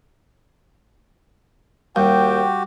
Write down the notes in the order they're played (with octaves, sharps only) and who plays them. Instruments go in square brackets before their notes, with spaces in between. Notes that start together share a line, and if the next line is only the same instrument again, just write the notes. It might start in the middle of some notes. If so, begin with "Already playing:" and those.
[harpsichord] D#2 [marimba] G3 [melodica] F#4 G4 [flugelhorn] G5